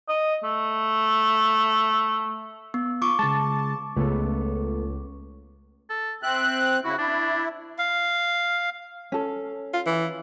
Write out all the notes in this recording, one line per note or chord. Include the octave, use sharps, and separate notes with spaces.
D#5
A3
B3
F4 C#6 D6
C#3 G#3 A5
C#2 A3 B3 A4
A4
C4 E5 F#6
C#3 E4 F#4
D4 E4
F5
C#4 A4
F4
E3